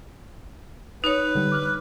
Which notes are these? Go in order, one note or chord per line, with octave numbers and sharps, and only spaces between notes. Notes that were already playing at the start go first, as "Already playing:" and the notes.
D#4 B4 C#5
D3 G3
D6 F6 F#6